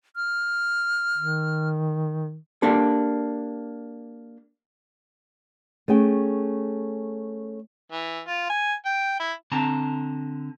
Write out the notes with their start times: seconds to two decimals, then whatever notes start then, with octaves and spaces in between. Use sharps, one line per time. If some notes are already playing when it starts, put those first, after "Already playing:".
0.16 F6
1.18 D#3
2.62 A#3 D4 G4 A4
5.88 A3 C#4 G#4 G5
7.92 E3
8.27 F4
8.50 G#5
8.85 G5
9.20 E4
9.52 D3 C4 A5 A#5